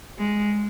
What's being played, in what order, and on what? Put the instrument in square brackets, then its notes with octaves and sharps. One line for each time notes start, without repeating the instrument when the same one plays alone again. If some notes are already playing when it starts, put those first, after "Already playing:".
[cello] G#3